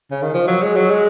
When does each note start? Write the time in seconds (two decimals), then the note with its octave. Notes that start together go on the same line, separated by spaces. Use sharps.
0.11 C#3
0.22 D#3
0.34 F3
0.48 F#3
0.63 G#3
0.76 F#3
0.91 G#3